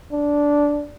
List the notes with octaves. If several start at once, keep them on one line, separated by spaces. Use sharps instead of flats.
D4